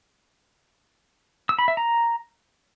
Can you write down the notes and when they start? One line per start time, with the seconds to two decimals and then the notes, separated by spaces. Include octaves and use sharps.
1.49 E6
1.59 B5
1.68 E5
1.77 A#5